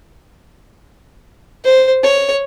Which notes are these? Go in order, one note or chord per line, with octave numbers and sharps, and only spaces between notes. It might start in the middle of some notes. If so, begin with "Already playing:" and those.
C5
C#5